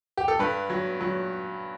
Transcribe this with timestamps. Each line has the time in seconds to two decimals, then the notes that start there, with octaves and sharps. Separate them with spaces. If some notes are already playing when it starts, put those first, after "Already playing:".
0.17 G4
0.28 A4
0.39 G2 B4
0.70 F#3
1.01 F#3